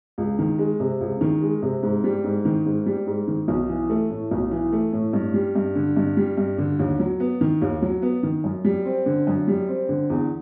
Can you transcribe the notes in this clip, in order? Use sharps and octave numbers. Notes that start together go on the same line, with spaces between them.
C#2
D#3
G#3
C3
C#2
D#3
G#3
C3
G#2
G3
G#2
D#3
G#2
G3
G#2
D#3
B1
E3
A3
A2
B1
E3
A3
A2
G2
G3
G2
D3
G2
G3
G2
D3
D#2
F#3
B3
D#3
D#2
F#3
B3
D#3
F#2
G3
C4
D3
F#2
G3
C4
D3
E2